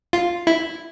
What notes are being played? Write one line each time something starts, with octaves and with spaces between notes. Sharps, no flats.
F4
E4